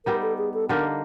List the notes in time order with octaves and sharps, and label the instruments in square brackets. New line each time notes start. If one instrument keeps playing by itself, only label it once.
[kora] G3 B3 D#4 [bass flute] A#4
[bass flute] A4
G#4
A4
[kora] D3 G3 A#3 D#4 [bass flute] A#4